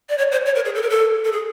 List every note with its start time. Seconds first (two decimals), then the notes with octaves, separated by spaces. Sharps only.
0.09 D5
0.18 C#5
0.32 C5
0.46 C#5
0.55 A#4
0.65 G#4
0.75 A4
0.82 A#4
0.90 A4
1.25 A4
1.32 G#4